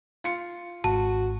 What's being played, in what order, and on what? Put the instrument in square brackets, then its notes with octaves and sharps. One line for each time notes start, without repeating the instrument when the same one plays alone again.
[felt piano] F4 C#7
[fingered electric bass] G#1 [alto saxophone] F#4 [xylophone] A5